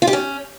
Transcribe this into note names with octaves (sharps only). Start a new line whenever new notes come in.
F4
G4
C#4